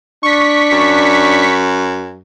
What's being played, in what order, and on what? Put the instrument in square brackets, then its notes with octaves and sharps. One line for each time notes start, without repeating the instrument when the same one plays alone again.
[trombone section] D4 [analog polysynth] C#6 B6
[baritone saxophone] F#2